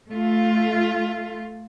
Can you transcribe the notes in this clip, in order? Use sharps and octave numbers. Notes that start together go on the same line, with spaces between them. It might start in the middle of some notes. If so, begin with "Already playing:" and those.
A3 F4